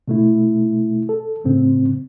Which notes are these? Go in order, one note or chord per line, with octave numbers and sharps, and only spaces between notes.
B2 A3 E4
A4
F#2 A2 C#3 C4